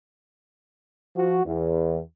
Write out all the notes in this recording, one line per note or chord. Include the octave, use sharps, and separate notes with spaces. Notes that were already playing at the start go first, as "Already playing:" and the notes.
F3 F#4
E2